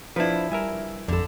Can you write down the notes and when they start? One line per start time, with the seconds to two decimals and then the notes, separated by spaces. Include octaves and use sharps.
0.16 F3 D4 E4 B4
0.52 G3 A#4 E5 G#5
1.08 G#1 F2 D3 A4